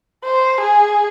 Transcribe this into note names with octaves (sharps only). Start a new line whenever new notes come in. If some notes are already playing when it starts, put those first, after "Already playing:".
C5
G#4